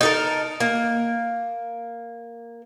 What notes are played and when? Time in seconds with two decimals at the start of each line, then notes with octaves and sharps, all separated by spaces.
0.01 D#4 A4 A#4
0.60 A#3